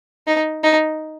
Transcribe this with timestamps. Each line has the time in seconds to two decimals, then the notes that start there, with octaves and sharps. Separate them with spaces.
0.27 D#4
0.64 D#4